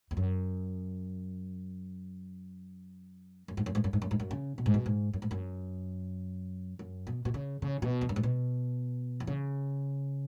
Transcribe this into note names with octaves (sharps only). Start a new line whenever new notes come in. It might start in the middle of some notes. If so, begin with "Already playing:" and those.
E2
F#2
F#2
G#2
F#2
G#2
F#2
G#2
F#2
G#2
F#2
C#3
B2
G#2
B2
G#2
F#2
G#2
F#2
F#2
B2
B2
C#3
C#3
B2
E2
F#2
G#2
B2
E3
C#3